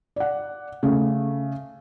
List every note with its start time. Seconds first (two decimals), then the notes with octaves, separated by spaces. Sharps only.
0.16 D5 F#5
0.83 C#3 A3